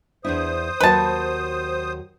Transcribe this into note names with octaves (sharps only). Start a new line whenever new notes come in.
E2 D4 E4 C5 D#6
D#2 F#3 F#4 B4 A5